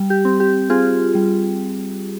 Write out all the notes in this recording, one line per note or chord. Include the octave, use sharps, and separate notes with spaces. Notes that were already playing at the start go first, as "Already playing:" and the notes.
Already playing: G3
G4
C4
G4
C4 F4 G#4
G3